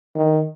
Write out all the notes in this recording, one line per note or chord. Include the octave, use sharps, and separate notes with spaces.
D#3